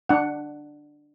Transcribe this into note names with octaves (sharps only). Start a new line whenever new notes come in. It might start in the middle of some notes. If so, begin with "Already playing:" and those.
D4 F#5